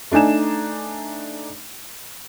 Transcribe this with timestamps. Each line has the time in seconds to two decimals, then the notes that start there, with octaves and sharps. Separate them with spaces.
0.12 A3 D4 D#4 G#5 E7